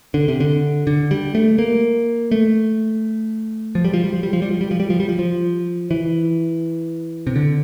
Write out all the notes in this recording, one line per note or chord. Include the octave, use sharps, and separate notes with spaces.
D3
C3
D3
D3
G3
A3
A#3
A3
F3
G3
F3
G3
F3
G3
F3
G3
F3
G3
F3
G3
F3
G3
F3
F3
E3
C3
D3